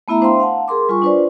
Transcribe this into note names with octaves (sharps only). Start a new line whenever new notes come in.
A3 B3 E4 E5 A#5
D4 C5 E5 F5 G5 C6
F5 F#5 A5
G#4 A#4 C6 D6
G3 F4 G#5 C#6
D4 F4 B4 C5 D5